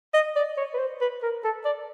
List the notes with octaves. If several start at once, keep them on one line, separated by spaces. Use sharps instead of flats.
D#5
D5
C#5
B4
C5
B4
A#4
A4
D5